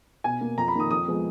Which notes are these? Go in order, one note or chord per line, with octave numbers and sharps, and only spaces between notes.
B2 G#5
A#3
F2 A#5
B5
D#3 A#3
D#6
F2 D#6
F3 G#3 B3